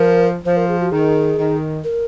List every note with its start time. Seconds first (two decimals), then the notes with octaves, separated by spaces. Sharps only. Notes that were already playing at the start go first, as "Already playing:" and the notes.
Already playing: F3 A#4
0.45 F3 C5
0.57 A#4
0.69 G#4
0.80 F#4
0.91 D#3 G#4
1.38 D#3
1.84 A#4